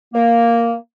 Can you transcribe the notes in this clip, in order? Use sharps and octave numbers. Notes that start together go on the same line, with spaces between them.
A#3